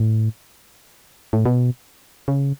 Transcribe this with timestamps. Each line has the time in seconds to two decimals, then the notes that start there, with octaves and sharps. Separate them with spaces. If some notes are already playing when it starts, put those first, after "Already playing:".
Already playing: A2
1.33 A2
1.46 B2
2.28 C#3